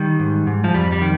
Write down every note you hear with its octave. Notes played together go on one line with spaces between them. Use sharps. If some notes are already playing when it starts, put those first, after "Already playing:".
Already playing: D#3 G3
G#2
G#2
F3
F2 G3
G3
D#3